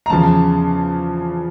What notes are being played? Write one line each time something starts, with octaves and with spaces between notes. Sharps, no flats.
A#5
E2 C#3 F3 A5